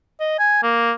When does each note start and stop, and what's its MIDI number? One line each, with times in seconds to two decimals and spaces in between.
0.20 0.37 75
0.39 0.58 80
0.63 0.93 58